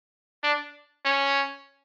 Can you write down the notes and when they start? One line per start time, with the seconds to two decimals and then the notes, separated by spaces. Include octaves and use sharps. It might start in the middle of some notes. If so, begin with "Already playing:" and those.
0.44 D4
1.05 C#4